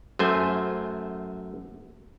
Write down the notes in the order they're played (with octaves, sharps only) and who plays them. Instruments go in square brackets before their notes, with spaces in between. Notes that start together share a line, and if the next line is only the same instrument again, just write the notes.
[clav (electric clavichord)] F#2 A3 C5 G#5